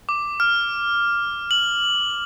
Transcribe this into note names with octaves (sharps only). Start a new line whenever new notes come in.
D6
F6
F#7